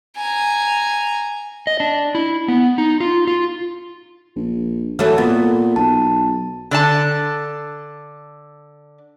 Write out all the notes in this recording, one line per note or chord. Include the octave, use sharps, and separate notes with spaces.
G#5 A#5
D#5
D4
E4
B3
D#4
F4
F4
A#1
E3 F#3 A3
A#2 B3
B1 A5
D3 D5 A5